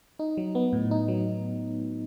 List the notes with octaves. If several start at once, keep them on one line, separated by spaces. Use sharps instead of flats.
D#4
F#3
B3
A2
D#4
F#3